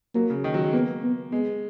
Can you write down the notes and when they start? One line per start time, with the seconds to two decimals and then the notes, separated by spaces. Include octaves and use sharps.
0.15 F#3 A#3
0.30 C#3
0.44 D#3
0.54 F#3
0.64 G#3
0.73 A#3 B3
1.03 B3
1.32 G#3 B3